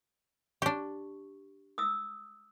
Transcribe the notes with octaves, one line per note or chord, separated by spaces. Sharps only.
D4 G4 C#6
D#6 E6